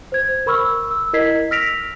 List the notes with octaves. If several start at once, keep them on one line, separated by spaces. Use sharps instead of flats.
C5 G#6
A#4 B5 C#6 E6 F6
E6
E4 A#4 D#5 G#6 B6 C7
E6 F6 A#6 B6 D7 F7